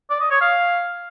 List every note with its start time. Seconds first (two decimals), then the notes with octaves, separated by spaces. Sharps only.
0.10 D5
0.20 D#5
0.30 C#5
0.41 F5